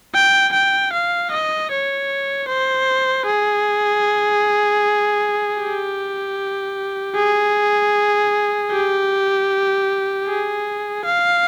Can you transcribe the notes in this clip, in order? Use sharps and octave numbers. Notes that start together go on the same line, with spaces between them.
G5
G5
F5
D#5
C#5
C5
G#4
G4
G#4
G4
G#4
F5